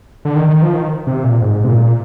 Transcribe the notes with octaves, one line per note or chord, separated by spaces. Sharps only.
D3
D#3
D#3
F3
D#3
C3
A#2
G#2
C3
A#2